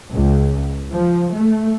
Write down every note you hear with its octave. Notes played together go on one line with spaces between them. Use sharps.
C#2
F3
A3